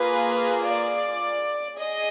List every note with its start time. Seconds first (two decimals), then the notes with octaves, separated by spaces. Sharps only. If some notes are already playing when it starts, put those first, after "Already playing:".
Already playing: A#3 F4 G#4 B4
0.64 D5
1.79 G#4 D#5